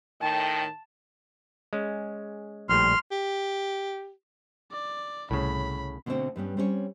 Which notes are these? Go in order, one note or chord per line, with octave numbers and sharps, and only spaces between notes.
A2 D#3 G5 A5
G#3 C#4
A#1 A2 G3 C6 F6
G4
D5
C2 A2 C#3 B5
B2 D3 A3 B3 C4 F#4
G2 G3 B3 C#4
G3 C4 C#4 A#4 C#5